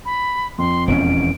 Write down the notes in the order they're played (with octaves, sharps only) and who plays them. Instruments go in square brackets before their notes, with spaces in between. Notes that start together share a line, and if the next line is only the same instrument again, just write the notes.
[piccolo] B5
[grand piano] F2 [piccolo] C6
[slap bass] E1 E2 C#4 [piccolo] D7